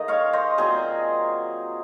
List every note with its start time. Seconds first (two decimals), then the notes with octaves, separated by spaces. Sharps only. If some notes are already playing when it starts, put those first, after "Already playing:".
Already playing: D#3 A#3 G#4 D#5
0.08 C#5 F5
0.33 C5 D#5
0.58 A#2 F#3 C4 G#4 C5